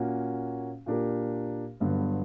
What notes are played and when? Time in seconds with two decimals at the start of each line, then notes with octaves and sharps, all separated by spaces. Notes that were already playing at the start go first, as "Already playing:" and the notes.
Already playing: A#2 A#3 C#4 F#4
0.86 A#2 A#3 D4 G4 A#4
1.80 G1 G2 D3 F#3 B3